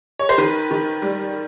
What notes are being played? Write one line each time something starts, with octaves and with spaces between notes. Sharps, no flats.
C#5
C5
D#3 B4
D#3
G3